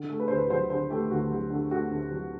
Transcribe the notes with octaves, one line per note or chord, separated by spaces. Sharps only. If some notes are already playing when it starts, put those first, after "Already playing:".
Already playing: D3
A3
B4
C5
D2 B4
F#3 C5
D3 C5
A3 G4
D2 F#4
F#3
D3
A3 F#4
D2
F#3